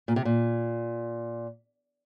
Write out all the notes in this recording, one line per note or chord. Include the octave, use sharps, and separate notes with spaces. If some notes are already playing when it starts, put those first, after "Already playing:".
A#2
C3
A#2